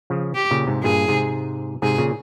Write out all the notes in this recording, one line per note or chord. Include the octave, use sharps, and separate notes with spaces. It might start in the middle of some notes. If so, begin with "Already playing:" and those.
C#3 F3
G4
A#2 C#3
G#2 C3
G2 A#2 G#4
G#2 C3
G#2 C3 G#4
A#2 C#3